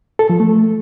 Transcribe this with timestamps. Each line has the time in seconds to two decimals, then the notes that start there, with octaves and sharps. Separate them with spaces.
0.19 A4
0.30 F3
0.40 A3